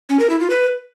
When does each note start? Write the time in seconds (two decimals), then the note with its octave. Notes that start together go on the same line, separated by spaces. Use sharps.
0.09 C#4
0.20 A#4
0.30 E4
0.40 F4
0.50 B4